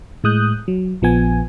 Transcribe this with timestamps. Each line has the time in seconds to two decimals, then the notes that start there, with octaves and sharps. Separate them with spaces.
0.24 A2 G#3 D#6 F#6 G6
0.68 F#3
1.02 A#1 F3 B3 G#5